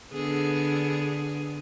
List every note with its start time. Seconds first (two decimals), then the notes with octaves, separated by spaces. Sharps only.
0.13 D3 B3 G#4